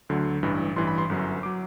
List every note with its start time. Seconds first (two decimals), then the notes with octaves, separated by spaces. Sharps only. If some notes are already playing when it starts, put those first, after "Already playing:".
0.09 D2 D3 F#3
0.43 A1 G2 E3
0.76 A1 G2 E3 C6
0.87 B5
0.98 C6
1.09 G1 F#2 F#3
1.43 F#3 D6